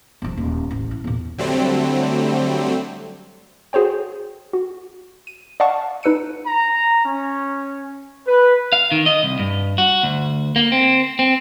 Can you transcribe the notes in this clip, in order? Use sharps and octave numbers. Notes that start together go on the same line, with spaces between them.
E1 F3
D#1
A1
E4
E2 A#2
D3 F#3 G3 A3 C4
F#4 G#4 C5 C#5 G5
F#4
D#7
D5 D#5 F5 F#5 A5 C#6
D#4 B4 E6 C#7 D#7
A#5
C#4
B4
F5
D#3
D#5
C2
G2
F#4
D2
A#3
C4
C4